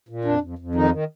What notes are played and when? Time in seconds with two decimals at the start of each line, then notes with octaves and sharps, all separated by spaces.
0.09 A#2
0.24 F2 D4
0.41 F2
0.59 F2
0.75 D#3 D#4
0.91 D#3